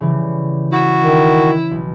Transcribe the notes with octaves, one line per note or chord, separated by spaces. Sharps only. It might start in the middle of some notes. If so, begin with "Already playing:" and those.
C#3 E3 G3
E4 F#4
D#3
B1